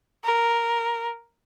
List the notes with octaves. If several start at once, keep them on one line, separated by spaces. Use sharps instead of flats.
A#4